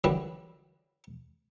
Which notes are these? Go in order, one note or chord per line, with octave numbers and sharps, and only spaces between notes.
F#2 D3 E3 G3